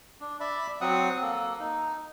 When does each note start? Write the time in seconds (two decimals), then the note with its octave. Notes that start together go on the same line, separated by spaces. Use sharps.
0.20 D4
0.40 D5 E5 B5
0.81 F#3 C4 F#5 D#6
1.22 A#3 A4
1.60 D#4